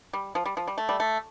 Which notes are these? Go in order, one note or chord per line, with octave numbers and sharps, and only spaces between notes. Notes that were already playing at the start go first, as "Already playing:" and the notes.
G3
F3
G3
F3
G3
A3
G3
A3